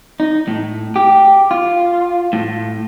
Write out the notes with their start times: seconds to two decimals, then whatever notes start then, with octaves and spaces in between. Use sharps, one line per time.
0.20 D#4
0.48 A2
0.96 G4
1.51 F4
2.33 A2